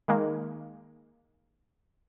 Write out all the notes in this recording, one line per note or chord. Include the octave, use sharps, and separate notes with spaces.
D#3 G#3 A#3